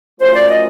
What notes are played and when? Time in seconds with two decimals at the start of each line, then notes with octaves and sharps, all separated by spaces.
0.20 F#2 C#3 F3 A3 C5
0.34 D5
0.49 D#5